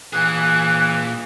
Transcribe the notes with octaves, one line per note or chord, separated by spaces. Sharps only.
A#2 E3 G#4 F#6